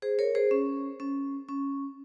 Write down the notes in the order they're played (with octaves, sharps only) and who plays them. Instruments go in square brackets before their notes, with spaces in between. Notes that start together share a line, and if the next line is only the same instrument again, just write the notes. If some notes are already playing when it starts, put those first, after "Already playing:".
[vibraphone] G#4 C5
A#4 C#5
G#4 C5
C#4
C#4
C#4